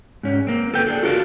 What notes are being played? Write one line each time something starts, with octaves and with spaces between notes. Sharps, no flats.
G#2 C#4
A#3 C4
A4 B4 G5
D4 G#4 A4
F4 F#4 A4 A#4 F5